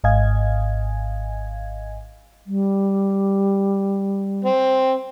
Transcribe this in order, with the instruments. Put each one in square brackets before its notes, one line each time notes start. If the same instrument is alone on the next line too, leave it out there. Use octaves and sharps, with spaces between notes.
[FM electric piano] G#1 G#2 D#5 F5 G#5 G#6
[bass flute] G3
[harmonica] C4